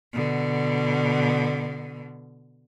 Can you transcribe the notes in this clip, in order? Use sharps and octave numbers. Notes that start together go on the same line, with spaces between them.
B2 D3